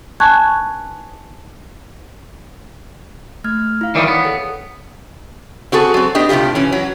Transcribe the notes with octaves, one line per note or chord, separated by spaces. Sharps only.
G#5 A5 C#6 F#6 G#6
A3 F6 G#6
E4 F5
D#3 E3 G3 C#5
B3
G#4 A4 G5
C4 F#4 G#4 A4
F#3 C4
B3 D4 G4 D#5
A2 C3 G3 F4 G4
E3 C#4
F#3